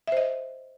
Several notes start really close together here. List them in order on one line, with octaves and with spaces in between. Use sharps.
E5 C5 D#5